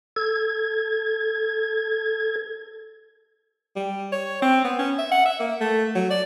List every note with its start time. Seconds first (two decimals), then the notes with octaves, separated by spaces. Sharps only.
0.16 A4 G#6
3.76 G3
4.12 C#5
4.42 C4
4.64 B3
4.79 C#4
4.98 E5
5.11 F#5
5.26 E5
5.40 A#3
5.60 A3
5.95 F#3
6.10 D5